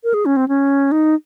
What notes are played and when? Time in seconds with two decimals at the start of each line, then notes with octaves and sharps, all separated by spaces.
0.04 A#4
0.14 G#4
0.26 C#4
0.37 C4
0.48 C#4
0.92 D#4